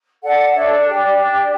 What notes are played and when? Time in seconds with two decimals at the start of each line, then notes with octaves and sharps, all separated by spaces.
0.22 A4 D5 F#5
0.54 D4 C#5 E5
0.71 D5
0.87 G4 D5
1.04 D5
1.20 D4